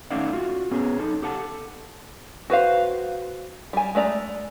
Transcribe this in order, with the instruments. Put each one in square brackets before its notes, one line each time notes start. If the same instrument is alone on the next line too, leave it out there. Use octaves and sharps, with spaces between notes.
[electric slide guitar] A3 C#4 D#4 D5 F5 F#5
F4 F#4
B3 C#4 G#4 C#5
D#4 A4
G4 A4 F#5 A5
[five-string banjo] F#4 B4 C5 F5
G3 G#5
G#3 A3 D5 A#5